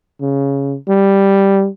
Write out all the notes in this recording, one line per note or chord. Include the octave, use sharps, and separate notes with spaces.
C#3
G3